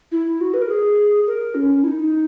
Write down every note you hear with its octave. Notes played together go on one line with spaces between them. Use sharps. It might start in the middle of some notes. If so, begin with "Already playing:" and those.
E4
F#4
B4
A#4
G#4
A#4
C#4
E4
D#4